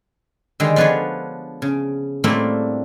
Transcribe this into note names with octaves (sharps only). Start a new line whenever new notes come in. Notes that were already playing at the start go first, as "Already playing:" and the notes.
D3 D#3 G3 G#3 D#4
F3 B3 D4 G#4 B4 C#5
C#3
A2 G3 A3 A#3 C4 D4